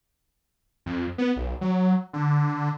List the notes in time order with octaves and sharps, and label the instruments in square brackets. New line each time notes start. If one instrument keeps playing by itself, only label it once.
[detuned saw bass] F2
B3
B1
F#3
D3